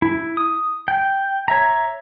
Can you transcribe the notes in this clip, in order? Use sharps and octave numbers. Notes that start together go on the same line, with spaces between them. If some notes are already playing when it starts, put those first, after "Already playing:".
E4
D#6
G5
C#5 E5 A#5